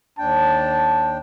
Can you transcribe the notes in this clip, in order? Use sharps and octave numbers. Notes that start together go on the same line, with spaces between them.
D#2 D4 G5 A5